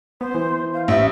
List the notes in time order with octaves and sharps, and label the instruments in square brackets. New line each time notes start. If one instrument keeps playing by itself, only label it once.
[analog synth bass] B3 [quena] C5
[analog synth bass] E3
[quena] F5
[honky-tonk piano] A1 [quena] E5